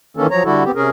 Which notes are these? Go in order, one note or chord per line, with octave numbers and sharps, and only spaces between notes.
D#3 E3 A#3 C#4 A4
F3 F#3 C#5 A#5
D3 G3 E4 F#4 A4
B3 C4 G4
C3 C#4 G#4 A#4